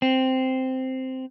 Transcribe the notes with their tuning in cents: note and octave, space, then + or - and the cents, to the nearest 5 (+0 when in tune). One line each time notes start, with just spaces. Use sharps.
C4 -5